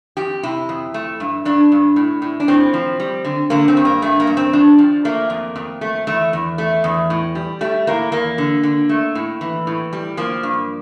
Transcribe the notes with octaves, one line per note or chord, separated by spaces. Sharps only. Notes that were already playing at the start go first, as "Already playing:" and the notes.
F2 G4
C3 E4
F2
A3
G2
G2 D4
G2
A2
A2
D4
A2 C4
F3
G3
D3
D3 A#3
C4
G2
A#3
G2 A3
A#3
G2
C4
F3 D4
F3
A3 A#3
F2
F2
A3
E2 A3
E2
A3
E2
A2
G3
G3 A3
A2 A#3
E2 A#3
D3
D3
A3
A2
E3
A2
G3
F3 A#3
G2